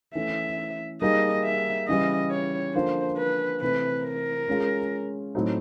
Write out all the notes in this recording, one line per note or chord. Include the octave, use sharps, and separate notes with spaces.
E3 A3 C#4 E5
G3 A#3 D#4 G#4 D#5
E5
C#3 E3 G3 D#5
C#5
D3 F3 A#3 C5
B4
C3 E3 A3 C4 B4
A#4
G#3 C#4 F4 G#4
A2 F#3 A3 C4 D#4